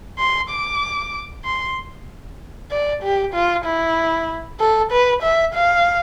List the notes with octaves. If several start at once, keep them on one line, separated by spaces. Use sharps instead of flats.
C6
D6
C6
D5
G4
F4
E4
A4
B4
E5
F5